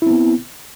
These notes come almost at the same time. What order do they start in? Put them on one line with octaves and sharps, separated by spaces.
E4 C4 B3